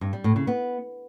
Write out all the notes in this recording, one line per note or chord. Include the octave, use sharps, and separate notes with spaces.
G2
G3
A2
C#3
B3